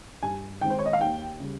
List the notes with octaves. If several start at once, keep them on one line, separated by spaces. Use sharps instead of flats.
G2 G#5
D#3 G#3 C4 G5
C5
C#5
D#5
F5
D#2 G5
C#3 G3